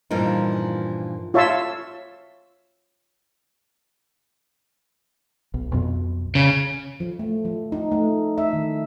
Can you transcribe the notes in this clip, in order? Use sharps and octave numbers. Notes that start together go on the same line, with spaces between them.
G2 A#2 E3 F3 A#3 D#4
F4 C#5 E5 A5 C6 E6
B1
B1 F2 B2
C#3
F3
A3
F3
D#4
A3
E5
D#3